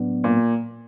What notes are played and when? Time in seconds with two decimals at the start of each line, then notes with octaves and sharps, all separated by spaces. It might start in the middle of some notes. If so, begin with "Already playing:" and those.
Already playing: A2 F#3 B3 D4
0.24 A#2